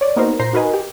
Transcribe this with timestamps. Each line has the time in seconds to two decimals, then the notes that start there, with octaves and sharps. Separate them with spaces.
0.01 C#5 D5
0.16 A#3 B3 D#4 F#4 A#4 C5
0.40 A#2 C5 A#5 C7
0.53 D#4 F#4 A#4 B4 D#5 G#5
0.74 G4